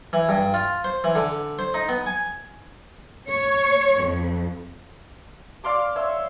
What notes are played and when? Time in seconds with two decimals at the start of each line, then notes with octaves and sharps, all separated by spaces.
0.13 E3
0.29 G2
0.54 F4
0.84 C5
1.04 E3
1.15 D3
1.59 C5
1.74 D#4
1.89 B3
2.06 G#5
3.28 C#5
4.02 F2
5.64 D5 F5 C6 D6
5.96 C#5 E5 C6